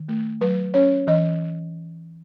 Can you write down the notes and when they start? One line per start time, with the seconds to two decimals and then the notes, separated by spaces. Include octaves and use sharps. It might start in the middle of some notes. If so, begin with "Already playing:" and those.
Already playing: D#3
0.09 A3
0.41 F#3 B4
0.74 C#4 C#5
1.07 E3 D#5